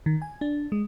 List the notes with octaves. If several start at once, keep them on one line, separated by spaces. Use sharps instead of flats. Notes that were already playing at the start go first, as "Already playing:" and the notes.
D#3
G#5
D4
G#3